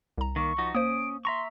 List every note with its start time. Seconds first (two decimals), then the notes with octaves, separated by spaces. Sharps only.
0.18 C2 A#5
0.36 D#3 A#3 C#6
0.58 F3 D#4 F#4
0.75 A#3 C#4 C5 D#6 D7
1.25 E5 A#5 C6 C#6